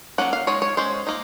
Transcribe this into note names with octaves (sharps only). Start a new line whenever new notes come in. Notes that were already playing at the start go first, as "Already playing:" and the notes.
F#3 A#3 C#4 F#5
F5
G#3 D#4 C#5
C#5
G#3 C#4 C5
A#3 D#4